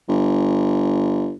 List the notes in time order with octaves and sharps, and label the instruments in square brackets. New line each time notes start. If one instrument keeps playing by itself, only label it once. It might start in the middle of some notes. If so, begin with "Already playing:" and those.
[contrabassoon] G1